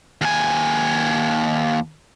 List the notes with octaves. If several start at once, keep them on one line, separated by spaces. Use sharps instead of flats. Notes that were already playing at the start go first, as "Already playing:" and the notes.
D#2 G#5